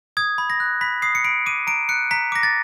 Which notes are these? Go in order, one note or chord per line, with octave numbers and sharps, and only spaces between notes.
D#6 G#6
B5
A#6
F#6
B5 B6
D#6 C7
C#7
B5 D7
D6 D#7
A#5 D7
F#6 C#7
A#5 B6
D6 A#6
A6